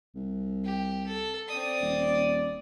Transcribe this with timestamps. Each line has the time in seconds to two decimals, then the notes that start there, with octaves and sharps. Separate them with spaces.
0.16 C2
0.65 G4
1.07 A4
1.48 C4 D5 D#6
1.81 D#1